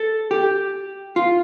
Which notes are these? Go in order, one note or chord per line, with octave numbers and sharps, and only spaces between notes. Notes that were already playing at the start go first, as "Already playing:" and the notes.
Already playing: A4
G4
F4